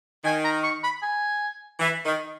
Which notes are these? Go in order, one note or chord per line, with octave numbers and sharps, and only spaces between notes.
D#3 G#5
A#5
C#6
B5
G#5
E3
D#3